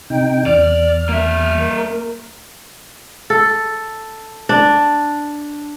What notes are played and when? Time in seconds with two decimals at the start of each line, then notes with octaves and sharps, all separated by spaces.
0.10 C3 D#4 G5
0.46 E2 D5 F6
1.09 A#3 E5
1.59 A#4
3.30 A4
4.49 D4